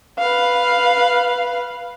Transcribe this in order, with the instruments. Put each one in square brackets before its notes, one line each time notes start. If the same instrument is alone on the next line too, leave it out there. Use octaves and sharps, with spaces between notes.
[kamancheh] B4 F5